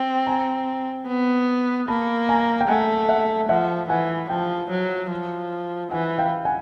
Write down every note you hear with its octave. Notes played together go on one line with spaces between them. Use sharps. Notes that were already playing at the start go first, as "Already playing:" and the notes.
Already playing: C4
G#5 A#5
B3
A#3 A5 B5
G#5 A#5
G5
A3 F#5 G#5
E5 F#5
F3 E5 F#5
E3 F#5 G#5
F3 G5 A5
F#3
F3
E3 F#5 G#5
F5 G5
F#5 G#5